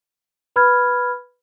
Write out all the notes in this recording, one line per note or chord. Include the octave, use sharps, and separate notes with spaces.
B4 B5 F6 G#6